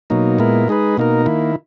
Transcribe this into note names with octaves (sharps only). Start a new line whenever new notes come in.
B2 F#3 A#3 D#4
A#2 G#3 B3 E4 A#4
G#3 D#4 G#4 B4
B2 A#3 D#4 A#4
D#3 A#3 E4